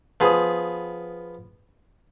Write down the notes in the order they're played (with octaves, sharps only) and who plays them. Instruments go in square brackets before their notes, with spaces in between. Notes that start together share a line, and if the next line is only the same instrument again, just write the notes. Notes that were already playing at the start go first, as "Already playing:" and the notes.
[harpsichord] F3 B3 G#4